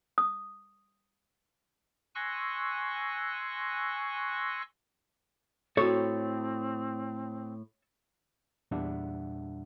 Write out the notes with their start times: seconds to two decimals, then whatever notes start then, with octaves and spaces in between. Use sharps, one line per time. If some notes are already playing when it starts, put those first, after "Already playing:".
0.18 D#6
2.15 G#5 C6 C#6 E6 F#6 A#6
5.77 A2 C4 F#4 A4 C#5 C#6
8.71 E2 A#2 G3 D4 E5 F#5